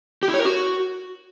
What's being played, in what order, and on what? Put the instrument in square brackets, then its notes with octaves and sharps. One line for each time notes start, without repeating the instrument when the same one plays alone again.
[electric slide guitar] G4
E4
C#5
A#4
F#4